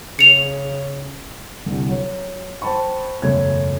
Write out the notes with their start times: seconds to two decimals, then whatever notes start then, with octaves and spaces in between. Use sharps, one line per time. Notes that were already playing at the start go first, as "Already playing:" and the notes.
0.19 C#3 C#7 F7
1.66 C2 D3
1.89 F#3 C#5
2.62 C5 G5 A5 B5 C#6
3.22 E1 F#2 C#3 A3 C#5 G#6